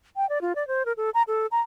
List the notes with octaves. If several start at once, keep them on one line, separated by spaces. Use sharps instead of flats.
G5
D5
F4
D5
C5
A#4
A4
A#5
A4
A#5